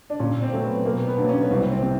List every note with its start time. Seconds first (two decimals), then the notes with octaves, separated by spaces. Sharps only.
0.10 D4
0.19 A#2 C#4
0.42 C4
0.53 F#3 A3
0.63 B3
0.85 B2 A#3
1.07 B3
1.18 F#3 A#3 D4
1.29 C#4
1.41 B3
1.50 C2 C4
1.71 C4
1.82 C3